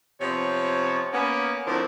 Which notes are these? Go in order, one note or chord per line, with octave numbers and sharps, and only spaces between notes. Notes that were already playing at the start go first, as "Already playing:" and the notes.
C3 F3 B3 C#5
A#3 B3 C#4
D2 F3 C4 D4 E4 A#4